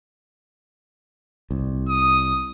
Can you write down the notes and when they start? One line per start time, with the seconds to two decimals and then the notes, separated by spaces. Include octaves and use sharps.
1.51 C2
1.89 D#6